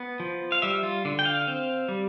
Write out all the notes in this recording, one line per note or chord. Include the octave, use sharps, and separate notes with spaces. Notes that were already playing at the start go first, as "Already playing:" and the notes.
Already playing: B3
F3
F5
G3 E5
F4
D3
G5
F5
C4
G3